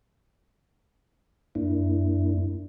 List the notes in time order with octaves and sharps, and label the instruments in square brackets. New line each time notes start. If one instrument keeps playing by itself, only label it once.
[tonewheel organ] F#2 A#3 D4 E4